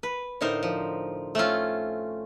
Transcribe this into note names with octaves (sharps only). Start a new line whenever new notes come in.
B4
A2 D3 D#4 A#4 C5
F3
A3 C4 C#4 F4